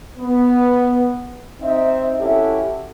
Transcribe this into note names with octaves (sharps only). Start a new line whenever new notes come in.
B3
C4 D#4 E5
C#4 E4 F#4 G4 A4 E5